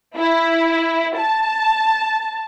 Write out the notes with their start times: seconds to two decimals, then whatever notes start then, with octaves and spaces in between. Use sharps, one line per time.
0.17 E4
1.17 A5